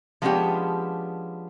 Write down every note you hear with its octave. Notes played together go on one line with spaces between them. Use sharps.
F3 G#3 B3 C#4 D4 G4